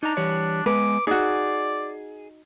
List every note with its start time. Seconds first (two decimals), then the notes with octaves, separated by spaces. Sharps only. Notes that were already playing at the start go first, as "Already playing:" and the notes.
0.03 D4 D#4 A#5
0.17 E3 G3 C#5
0.66 G#3 B3 B4 D6
1.07 D#4 F#4 G#4 D5